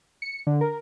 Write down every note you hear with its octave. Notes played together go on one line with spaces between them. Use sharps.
C#7
D3
A#4